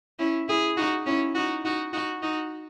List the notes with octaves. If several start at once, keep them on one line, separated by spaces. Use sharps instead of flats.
C#4 E4
E4 G#4
D#4 F#4
C#4 E4
D#4 F#4
D#4 F#4
D#4 F#4
D#4 F#4